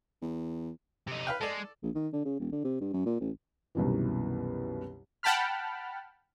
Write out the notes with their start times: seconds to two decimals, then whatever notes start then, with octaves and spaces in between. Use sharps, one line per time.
0.22 E2
1.07 C3 D#4
1.27 B4 F5 G5
1.41 G#3 A4 D5
1.83 A#1
1.95 D#3
2.13 D3
2.25 C#3
2.39 E1
2.52 D3
2.64 C3
2.81 G2
2.93 F#2
3.06 A#2
3.20 A1
3.75 C2 F#2 B2 D#3 E3
5.23 F#5 G5 A5 B5 F6